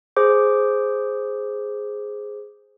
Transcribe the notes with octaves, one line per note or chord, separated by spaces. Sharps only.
G#4 C5 D6